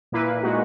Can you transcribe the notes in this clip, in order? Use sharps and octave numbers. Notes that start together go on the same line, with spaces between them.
A#2 A#3 E4 B4
A#2 G#3 D#4 F#4